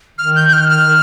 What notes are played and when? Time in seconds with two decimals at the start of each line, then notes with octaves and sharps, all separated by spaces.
0.18 D#3 F6
0.36 G6
0.49 G6
0.53 F6
0.70 F6